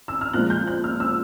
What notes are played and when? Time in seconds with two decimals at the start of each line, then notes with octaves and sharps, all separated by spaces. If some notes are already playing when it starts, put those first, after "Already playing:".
0.08 E6
0.21 F6
0.33 A#2 F3 G#3 F#6
0.50 G6
0.67 F#6
0.84 F6
1.00 E6